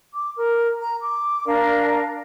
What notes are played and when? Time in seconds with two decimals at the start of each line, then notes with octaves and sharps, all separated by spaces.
0.14 D6
0.37 A#4
0.80 A#5
1.00 D6
1.46 D4 A#4 D5 F5